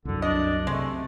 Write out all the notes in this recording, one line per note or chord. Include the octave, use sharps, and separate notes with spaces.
C2 F#2 D3
D4 D#5
C3 G#3 A3